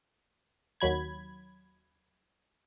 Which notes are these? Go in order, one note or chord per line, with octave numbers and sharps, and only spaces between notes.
D#2 F#3 B5 G#6